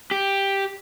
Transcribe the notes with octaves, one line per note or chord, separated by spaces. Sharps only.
G4